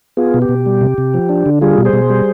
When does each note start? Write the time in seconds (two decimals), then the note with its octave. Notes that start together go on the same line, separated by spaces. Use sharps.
0.17 B3 F4 G#4
0.34 B2
0.42 G4
0.49 B2
0.66 G3
0.81 C3
0.98 C3
1.14 F3
1.29 D4
1.46 D3
1.61 G3 F4 G#4
1.78 B2
1.85 G#4 C5
1.93 B2
2.10 G3